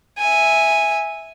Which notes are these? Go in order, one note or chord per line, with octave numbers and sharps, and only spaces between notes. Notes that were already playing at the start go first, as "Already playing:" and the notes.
E5 G#5